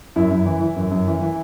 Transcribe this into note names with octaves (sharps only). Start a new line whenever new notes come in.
F#2 E4
F#2
E3
E3
F#2
F#2
E3
E3